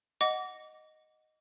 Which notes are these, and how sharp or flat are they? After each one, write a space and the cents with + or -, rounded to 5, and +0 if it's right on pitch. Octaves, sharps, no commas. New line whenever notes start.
D#5 +0 F#5 +0 D6 -30